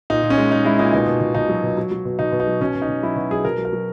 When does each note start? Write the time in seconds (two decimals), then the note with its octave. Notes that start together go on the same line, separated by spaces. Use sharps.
0.10 A#2 D#4
0.23 A#2
0.30 C#4
0.38 G#3
0.52 G#3 D#4
0.65 G#3 E4
0.79 A#2 D#4
0.93 B2 D#4
1.07 B2
1.21 B2
1.35 B2 D#4
1.49 F#3
1.63 B2
1.77 F#3
1.91 F#3
2.05 B2
2.19 B2 D#4
2.32 B2
2.40 D#4
2.47 F#3
2.61 B2 C#4
2.75 B2
2.82 D#4
2.88 B2
3.03 F#3 E4
3.16 B2 F#4
3.31 F#3 G#4
3.45 B2 A#4
3.58 F#3
3.65 A#4
3.73 F#3